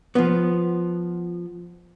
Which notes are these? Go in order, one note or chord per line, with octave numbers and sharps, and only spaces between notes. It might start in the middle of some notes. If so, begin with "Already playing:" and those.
F3 B3